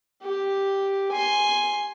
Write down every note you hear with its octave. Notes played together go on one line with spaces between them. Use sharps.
G4
G#5 C6